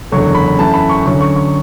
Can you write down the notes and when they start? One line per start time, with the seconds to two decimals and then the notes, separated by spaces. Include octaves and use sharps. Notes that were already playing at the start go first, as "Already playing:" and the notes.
0.12 F#1 E2 D3 F#3 A3 C#6
0.35 B5
0.59 F#2 E3 A3 E4 A5
0.74 B5
0.89 C#6
1.05 D2 D3 F#3 C#4 C#6
1.21 C#6
1.36 C#6